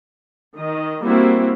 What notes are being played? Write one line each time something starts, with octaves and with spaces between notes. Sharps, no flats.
D#3 D#5
G3 A#3 C4 E4 F#4